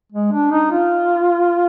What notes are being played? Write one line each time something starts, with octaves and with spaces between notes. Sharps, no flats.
G#3
D4
D#4
F4